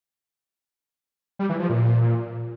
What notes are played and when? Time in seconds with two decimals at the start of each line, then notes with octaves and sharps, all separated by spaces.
1.39 G3
1.49 E3
1.60 F3
1.70 A#2